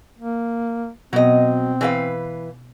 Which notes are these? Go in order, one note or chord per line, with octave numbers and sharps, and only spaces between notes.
A#3
B2 F#3 B3 C4 D#5
E3 B4 F5